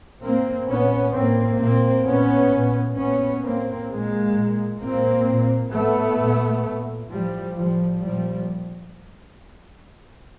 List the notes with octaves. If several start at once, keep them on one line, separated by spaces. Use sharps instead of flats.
A#2 A#3 C4
A#2 B3 C#4
A2 A#3 C4
A#2 A#3 C4
A#2 B3 C#4
A#2
A#2 B3 C#4
A2 A#3 C4
A#2 G#3 A#3
A#2
A#2 A#3 C4
A#2
A2 A3 B3
A#2
A#2
A2 F3 G3
A2 F3 G3
A#2 F3 G3